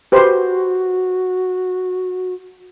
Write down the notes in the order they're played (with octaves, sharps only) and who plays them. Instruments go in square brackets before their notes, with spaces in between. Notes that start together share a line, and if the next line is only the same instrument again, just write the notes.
[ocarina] F#4 [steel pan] G4 B4 C5